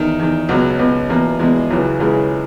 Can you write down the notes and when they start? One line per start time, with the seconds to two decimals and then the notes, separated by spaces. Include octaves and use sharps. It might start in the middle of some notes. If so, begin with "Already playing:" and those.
Already playing: E2 D#3
0.20 E2 D#3
0.49 C#2 B2 F#3
0.79 C#2 B2
1.09 E2 B2 A#3
1.40 E2 B2 G#3
1.70 C#2 C#3 E3 F#3
2.00 C#2 C#3 E3 G#3